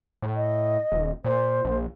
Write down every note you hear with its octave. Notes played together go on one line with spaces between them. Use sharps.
A2
D#5
D#1
A#2 C5
A#1